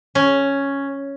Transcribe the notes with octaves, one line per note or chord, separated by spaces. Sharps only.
C#4